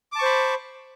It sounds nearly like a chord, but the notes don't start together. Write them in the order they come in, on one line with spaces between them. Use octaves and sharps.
D6 A5 C#6 C5 B5